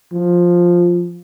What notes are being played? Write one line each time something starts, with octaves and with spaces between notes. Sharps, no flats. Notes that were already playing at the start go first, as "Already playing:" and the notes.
F3